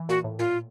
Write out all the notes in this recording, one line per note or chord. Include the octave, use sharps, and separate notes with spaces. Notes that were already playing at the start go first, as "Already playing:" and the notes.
Already playing: E3
A#2 F#4
A2
A#2 F4